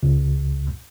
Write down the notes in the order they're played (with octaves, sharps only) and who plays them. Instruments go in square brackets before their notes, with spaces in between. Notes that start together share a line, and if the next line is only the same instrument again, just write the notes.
[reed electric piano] C#2